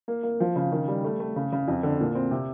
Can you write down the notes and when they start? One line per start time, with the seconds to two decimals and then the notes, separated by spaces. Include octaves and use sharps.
0.08 A#3
0.23 A#3
0.40 F3
0.56 C#3
0.72 D#3
0.88 G3
1.04 A3
1.20 A3
1.36 C#3
1.52 C#3
1.68 F2
1.83 D3
2.00 A#2
2.15 C4
2.31 C3